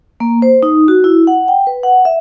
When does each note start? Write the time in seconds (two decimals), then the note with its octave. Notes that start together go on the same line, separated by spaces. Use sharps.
0.20 A#3
0.42 C5
0.63 D#4
0.88 F#4
1.04 E4
1.27 F#5
1.48 G5
1.67 B4
1.83 F#5
2.05 E5